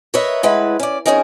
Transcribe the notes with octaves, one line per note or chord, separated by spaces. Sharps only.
A#4 B4 C#5 D#5 E5
A2 G#3 E4 B4 F#5
C#4 D5
F2 G3 C#4 D#4 G#4 A#4